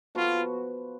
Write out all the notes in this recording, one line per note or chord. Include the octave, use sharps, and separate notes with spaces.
F3 B3 F4 F#4